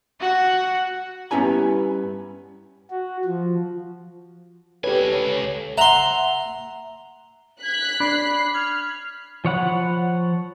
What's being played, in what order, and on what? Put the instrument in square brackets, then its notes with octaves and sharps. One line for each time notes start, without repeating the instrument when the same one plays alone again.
[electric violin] F#4 F#5
[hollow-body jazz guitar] G2 B3 C#4 E4 G#5 A#5
[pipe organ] F#4
F3
[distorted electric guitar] C#2 G#5 [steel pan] G4 B4 [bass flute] A4 [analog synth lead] C#5
[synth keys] E5 F#5 [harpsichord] A#5 C6
[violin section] F#6 B6 [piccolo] G#6
[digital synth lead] D4 [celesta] B5 [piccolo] C7
[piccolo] F6 [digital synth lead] G#6
[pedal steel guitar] F3 C#5 F#5 B5